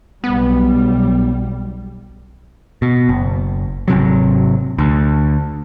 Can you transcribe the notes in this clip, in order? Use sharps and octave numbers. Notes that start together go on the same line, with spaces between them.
B1 G3 B3
B2
F#1
G#1 C3 F#3
D2